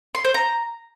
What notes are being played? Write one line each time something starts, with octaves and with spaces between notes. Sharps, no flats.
C6
C5
A#5